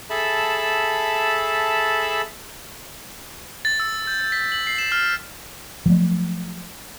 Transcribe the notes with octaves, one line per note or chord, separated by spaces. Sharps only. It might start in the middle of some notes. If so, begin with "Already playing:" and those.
G#4 A4 E5 A5 B5
A6
E6
G6
B6
F#7
C7
E7
F6
F3 F#3 A3